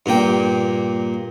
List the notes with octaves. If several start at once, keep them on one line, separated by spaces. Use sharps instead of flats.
G2 A#2 A#3 G5